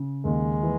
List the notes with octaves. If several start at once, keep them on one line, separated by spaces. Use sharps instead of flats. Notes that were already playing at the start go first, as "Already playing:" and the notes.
Already playing: C#3
D#2 G#3
E3